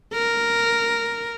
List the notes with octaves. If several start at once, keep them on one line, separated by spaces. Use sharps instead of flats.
A#4